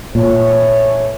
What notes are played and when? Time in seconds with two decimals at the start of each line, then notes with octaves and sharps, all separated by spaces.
0.15 A#2 E3 A3 C#5